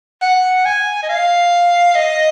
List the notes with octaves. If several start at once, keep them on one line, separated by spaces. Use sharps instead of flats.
F#5
G#5
D#5
F5
D#5